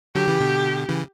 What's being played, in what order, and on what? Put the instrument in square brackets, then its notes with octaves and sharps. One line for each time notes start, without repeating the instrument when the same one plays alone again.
[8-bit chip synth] D3 F#3 [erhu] G4
[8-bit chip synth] C#3 E3
B2 D3
C#3 E3